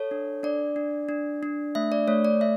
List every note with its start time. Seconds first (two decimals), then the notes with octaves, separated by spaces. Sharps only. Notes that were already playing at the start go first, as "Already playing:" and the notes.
Already playing: A4 C#5
0.11 D4
0.43 D4 D5
0.76 D4
1.09 D4
1.43 D4
1.75 A3 E5
1.92 D5
2.08 A3 C#5
2.25 D5
2.41 A3 E5